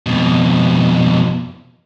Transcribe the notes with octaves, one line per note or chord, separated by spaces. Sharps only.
F2 B2